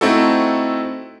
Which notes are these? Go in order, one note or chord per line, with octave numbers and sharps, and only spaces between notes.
A3 C4 D#4 E4 F#4 A4